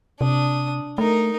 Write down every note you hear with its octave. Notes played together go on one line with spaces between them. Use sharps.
C3 D4 D#6
A3 D#4 A#4